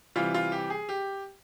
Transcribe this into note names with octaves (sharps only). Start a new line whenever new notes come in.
C3 E3 G3 F4
F4
G4
G#4
G4